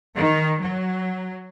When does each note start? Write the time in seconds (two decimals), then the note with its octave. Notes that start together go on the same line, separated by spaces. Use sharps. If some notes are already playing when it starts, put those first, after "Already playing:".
0.18 D#3
0.63 F#3